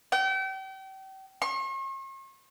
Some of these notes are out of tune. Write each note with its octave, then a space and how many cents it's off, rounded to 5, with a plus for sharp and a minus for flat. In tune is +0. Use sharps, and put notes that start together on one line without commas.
G5 -35
C#6 -45